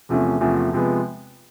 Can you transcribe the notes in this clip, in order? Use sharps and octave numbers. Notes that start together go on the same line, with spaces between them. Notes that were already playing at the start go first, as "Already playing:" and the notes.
E2 C3 F3 A3 C#4
E2 C3 F3 A3 C#4
C3 F3 G#3 B3